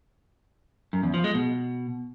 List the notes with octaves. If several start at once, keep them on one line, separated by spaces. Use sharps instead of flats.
F#2
E2
F3
G#3
B2